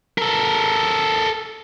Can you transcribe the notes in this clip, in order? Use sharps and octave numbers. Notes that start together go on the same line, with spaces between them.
A4 A#4